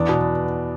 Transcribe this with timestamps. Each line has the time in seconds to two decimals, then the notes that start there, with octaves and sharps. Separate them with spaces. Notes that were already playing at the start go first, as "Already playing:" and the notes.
Already playing: E2 D4
0.09 B2